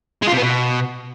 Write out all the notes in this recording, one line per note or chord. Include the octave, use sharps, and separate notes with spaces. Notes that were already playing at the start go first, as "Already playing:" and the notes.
G#3
F4
C3
B3
B2